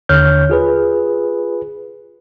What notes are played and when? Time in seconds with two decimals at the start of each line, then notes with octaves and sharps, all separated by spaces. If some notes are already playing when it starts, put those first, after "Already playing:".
0.09 D#2 D3 C#5 F6 G6
0.50 F4 G#4 B4